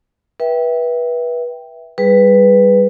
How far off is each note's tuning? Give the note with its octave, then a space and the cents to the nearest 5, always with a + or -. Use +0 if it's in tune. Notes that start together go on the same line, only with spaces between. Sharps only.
B4 -25 E5 +0 G5 +0
G3 +10 G#4 +0 B4 +0